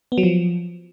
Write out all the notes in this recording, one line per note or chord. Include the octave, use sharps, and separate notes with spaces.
B3
F#3
F3